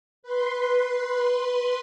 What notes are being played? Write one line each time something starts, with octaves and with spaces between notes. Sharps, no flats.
B4 C6